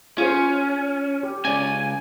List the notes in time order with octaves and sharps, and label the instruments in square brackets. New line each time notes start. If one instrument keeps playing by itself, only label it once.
[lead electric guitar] C#4 [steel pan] F4 G#4 C5
[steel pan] G4
[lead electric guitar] C#2 G#5 [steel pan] C#4 D5